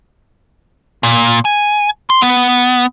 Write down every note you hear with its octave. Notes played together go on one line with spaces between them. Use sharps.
A#2
G#5
C6
B3